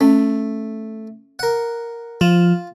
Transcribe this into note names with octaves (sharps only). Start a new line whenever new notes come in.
A3 C#4
A#4 F#5
F3 F4